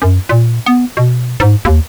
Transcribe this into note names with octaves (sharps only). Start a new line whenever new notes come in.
F#2
A#2
B3
B2
G#2
D#2